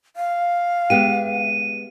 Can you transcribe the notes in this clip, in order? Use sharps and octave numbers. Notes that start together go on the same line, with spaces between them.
F5
G#3 B3 G4 D#7